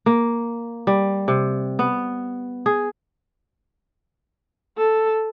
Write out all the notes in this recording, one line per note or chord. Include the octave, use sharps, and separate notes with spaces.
A#3
G3
C3
B3
G#4
A4